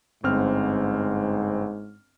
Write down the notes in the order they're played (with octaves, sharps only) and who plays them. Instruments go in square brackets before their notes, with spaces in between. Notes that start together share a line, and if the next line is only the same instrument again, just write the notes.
[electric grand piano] G1 C4 F6 [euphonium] G#2